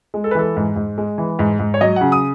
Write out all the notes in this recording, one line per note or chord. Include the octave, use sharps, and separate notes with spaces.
G#3
A4
B4
E3 A4
G#2
G#2
G#3
E3
G#2
G#2
C#5
F#3 D#5
C#3 F#5
D#6